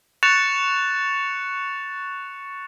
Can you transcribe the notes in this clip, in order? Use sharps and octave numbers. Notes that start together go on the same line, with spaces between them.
C#6 F#6 A6 C#7 E7 F7